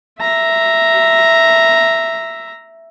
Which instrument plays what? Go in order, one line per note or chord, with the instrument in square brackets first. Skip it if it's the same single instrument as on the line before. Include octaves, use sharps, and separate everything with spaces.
[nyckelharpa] E5 A#5